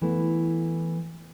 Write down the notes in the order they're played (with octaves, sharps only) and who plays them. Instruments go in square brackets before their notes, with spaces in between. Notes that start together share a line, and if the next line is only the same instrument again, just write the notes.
[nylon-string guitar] E3 A3 B3